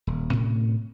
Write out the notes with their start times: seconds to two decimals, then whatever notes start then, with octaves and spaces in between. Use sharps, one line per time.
0.07 D#1
0.31 A2 C3 C#4